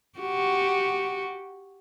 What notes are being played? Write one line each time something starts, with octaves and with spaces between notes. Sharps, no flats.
F#4 G4